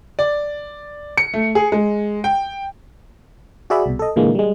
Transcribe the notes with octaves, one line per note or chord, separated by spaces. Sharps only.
D5
C#7
A3
G#4
G#3
G5
F#4 G#4 D5 E5 B5
C2 B2
A4 D#5
A#2 D3 E3 G#3 A#3
G3 G#3